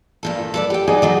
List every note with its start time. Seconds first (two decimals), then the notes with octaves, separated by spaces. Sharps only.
0.23 G2 A#2 A4
0.54 A4 B4 D5
0.70 G4 G5
0.88 F#3 D#4 G#4 D5
1.02 D#3 F#3 A3